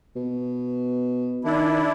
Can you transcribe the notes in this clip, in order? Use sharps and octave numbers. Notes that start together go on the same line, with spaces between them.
B2
D#3 D4 E4